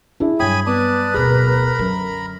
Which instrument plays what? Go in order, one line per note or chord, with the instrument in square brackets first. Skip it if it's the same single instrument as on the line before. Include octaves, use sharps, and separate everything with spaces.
[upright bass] F2 [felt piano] D4 E4 G#4
[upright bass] G2 F#3 [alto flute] C#5 [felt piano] G5 [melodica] G#5 B5 D#6
[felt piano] B3 [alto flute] B4 [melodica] D5 A5 D#6
[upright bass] D1 B2 [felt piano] G#4 [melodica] A#4 A#5 B5
[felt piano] F#2 [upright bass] D3